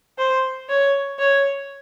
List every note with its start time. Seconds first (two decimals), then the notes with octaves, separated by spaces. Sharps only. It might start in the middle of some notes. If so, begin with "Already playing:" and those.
0.18 C5
0.69 C#5
1.19 C#5